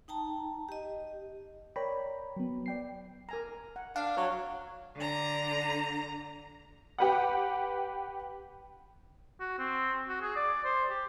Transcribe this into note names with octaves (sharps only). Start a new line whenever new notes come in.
D#4 G5 A5 A#5
G4 D#5
A#4 C#5 D5 G5 A#5 B5
F#3 B3
D5 G5 C7
A#4 G#5 A#5
F#5
D4 F5
F#3 C#5
D3 A#5
G4 B4 F#5
F#4
C4
F#4
G#4
D5
C5
G4